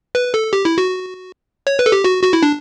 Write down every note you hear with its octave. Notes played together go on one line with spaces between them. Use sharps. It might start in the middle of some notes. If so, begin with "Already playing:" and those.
B4
A4
G4
E4
F#4
C#5
B4
A4
G4
F#4
F#4
E4
D4